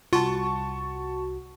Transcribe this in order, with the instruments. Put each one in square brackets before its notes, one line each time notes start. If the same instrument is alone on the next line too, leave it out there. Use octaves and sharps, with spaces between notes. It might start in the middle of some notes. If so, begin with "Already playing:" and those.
[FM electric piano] C2 F#4 [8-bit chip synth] F4 [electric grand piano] A5 C#6